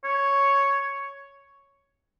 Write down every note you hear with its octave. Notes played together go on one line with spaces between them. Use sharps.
C#5